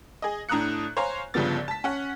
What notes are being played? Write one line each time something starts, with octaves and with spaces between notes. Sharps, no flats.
G#4 D#5
A2 D4 A#5 D#6 F#6 C#7
C5 C#5 F5 G#5 A#5
G1 G2 C#3 F3 B3 A6
A5 B6
C#4 F#5